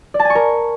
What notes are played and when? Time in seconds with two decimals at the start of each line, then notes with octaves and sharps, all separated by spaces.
0.14 D5
0.19 A5
0.25 G#5
0.30 C#6
0.35 A#4